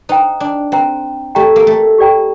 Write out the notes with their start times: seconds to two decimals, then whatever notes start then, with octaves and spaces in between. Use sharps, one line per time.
0.09 D#4 C5 G5 A#5
0.40 D4
0.72 C4 C5 G5 A#5
1.35 A3 G4 D5 G5 A#5
1.56 A#3
1.67 A3
1.98 G4 D5 G5 A#5